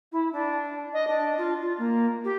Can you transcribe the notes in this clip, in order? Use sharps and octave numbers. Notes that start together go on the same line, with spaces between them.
E4
D4
D#5
D4
F4
F4
A#3
G4